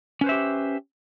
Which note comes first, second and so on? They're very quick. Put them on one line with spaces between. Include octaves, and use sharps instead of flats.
C#4 B4 C5 E5 G4